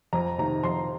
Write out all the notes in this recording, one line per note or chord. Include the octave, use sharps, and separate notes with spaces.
F2 A#5
C3 D#3 A#5
F2 C6